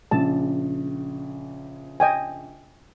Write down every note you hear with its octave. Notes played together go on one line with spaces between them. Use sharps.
A#1 C#3 A5
D#5 G5 G#5